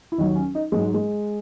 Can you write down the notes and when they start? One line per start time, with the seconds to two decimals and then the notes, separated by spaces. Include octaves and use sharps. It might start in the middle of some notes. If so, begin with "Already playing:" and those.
0.12 E4
0.18 D#2 D#3 F#3 D#4
0.36 C#4
0.55 D#4
0.72 G#2 F#3 G#3
0.94 G#3